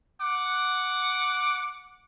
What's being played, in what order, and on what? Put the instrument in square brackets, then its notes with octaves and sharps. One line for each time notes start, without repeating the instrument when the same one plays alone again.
[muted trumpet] F#5 [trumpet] D6